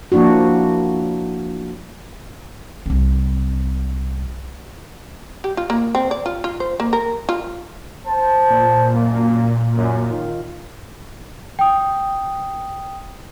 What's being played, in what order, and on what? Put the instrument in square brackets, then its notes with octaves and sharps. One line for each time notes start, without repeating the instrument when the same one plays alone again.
[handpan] F3 A#3 D4 E4 F#4
[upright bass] C2 C4
[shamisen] G4
F4
A#3
C4
D5
F4
F4
C5
A#3
A#4
F4
[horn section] C5 A5
[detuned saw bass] A#2
[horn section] F#2 A#3
F#2
D#3 F4
[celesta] G5 D#6